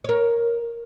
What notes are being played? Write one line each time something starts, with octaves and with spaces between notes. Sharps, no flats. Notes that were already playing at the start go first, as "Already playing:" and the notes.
A#4 C#5